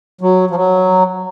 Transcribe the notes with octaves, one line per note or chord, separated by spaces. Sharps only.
F#3
F3
F#3